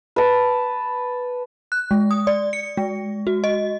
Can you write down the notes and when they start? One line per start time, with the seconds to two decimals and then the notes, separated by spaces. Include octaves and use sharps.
0.16 B4 A5
1.72 F#6
1.91 G#3
2.11 D#6
2.27 D5
2.53 C#7
2.77 G#3
3.27 F#4
3.44 D#5